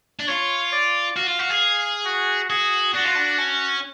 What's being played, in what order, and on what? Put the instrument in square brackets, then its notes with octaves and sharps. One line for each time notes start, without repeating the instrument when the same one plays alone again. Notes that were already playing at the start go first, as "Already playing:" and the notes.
[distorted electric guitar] D4
[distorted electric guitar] F4 [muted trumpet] C#5
[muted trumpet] D5
[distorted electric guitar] F#4 [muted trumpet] F5
[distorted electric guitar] F4
F#4
G#4
[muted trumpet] F#4
[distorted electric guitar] F#4 [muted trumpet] G#4
[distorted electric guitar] D4 [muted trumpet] F#4
[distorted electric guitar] F4
D4
C#4